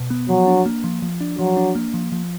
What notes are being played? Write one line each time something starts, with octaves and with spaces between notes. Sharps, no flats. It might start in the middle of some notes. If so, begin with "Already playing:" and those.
Already playing: B2
B3
F3 F#3
D4
A#3
F3
F3
D4
F3 F#3
D4
A#3
F3
F3